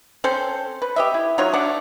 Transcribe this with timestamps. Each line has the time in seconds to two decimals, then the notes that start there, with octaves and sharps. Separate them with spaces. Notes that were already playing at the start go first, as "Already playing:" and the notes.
0.24 C4 C#4 A4 C5
0.82 B4
0.96 G4 D#5 E5
1.14 E4
1.38 F#3 D#4 F4 C#5
1.53 A3 D4 F#5